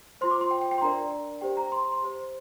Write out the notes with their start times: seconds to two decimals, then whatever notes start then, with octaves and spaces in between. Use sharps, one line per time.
0.21 F4 C5 C6
0.31 D6
0.41 C6
0.51 G5
0.61 G5
0.71 G5
0.78 C6
0.81 D4 A#4 D5 A#5
1.41 G4 C5 G5
1.57 A#5
1.72 C6
1.82 C6
1.92 C6
2.02 G4 C5